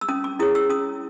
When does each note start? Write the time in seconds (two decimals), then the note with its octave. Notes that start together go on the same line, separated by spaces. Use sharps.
0.01 E6
0.08 C#4 D#6
0.24 D6
0.39 E4 G#4 C#5 D#6
0.55 E6
0.69 C#4 D#6